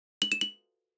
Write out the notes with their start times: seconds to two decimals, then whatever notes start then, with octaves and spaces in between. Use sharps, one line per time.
0.22 F#7
0.32 E7
0.41 F#7